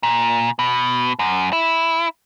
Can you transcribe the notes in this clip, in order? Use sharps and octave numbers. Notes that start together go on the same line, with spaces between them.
A#2
B2
F#2
E4